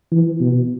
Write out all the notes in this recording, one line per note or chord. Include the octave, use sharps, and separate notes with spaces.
E3
B2